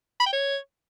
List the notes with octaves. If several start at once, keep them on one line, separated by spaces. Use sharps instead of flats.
B5
G5
C#5